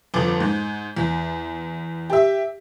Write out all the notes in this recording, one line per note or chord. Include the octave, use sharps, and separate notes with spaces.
G1 F2 D6
G#2
E2
G4 E5